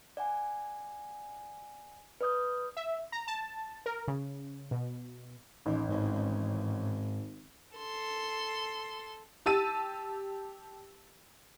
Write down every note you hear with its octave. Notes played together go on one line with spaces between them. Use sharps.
D5 F#5 G#5
B4 D5 D#6 G6
E5
A#5
A5
A#4
C#3
B2
A1 D#2
G#1 G#2
G#1
A4 C6
G4 A5 E6 A6 D#7